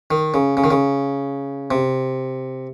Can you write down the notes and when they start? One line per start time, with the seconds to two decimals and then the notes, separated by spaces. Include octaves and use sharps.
0.11 D#3
0.34 C#3
0.57 C#3
0.64 D#3
0.71 C#3
1.71 C3